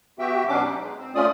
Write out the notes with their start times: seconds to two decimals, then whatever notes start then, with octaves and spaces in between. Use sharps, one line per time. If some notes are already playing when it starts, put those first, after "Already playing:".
0.19 B3 F#4 G4 E5 G5
0.48 B2 F#3 B3 C#4 D4 D6
0.64 D#4
0.81 G#3
0.98 C4
1.15 A3 C#4 F4 D5 D#6